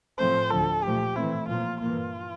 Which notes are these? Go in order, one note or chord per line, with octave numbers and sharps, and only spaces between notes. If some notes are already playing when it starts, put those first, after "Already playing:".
A2 F3 A3 C4 C5
D2 D3 F3 A4
A#2 F3 A3 G4
A2 E3 A3 C4 E4
A#2 F3 A#3 F4
G2 E3 A#3 F4